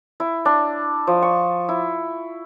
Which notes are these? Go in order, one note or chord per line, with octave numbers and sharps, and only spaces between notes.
E4
D4
F3
C#6
E4